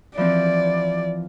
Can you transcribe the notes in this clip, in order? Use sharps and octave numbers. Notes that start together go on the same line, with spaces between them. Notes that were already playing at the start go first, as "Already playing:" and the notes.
E3 F3 C4 D5